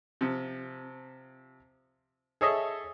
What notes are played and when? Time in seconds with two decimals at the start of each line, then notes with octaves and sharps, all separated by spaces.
0.21 C3 F3
2.41 G#4 A4 C#5 D#5 E5